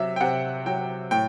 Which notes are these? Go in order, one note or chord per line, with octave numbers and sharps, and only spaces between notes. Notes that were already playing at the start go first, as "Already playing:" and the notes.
Already playing: C3 F#3 E5
G5
C3 F#5
F#3 G5
A2 G5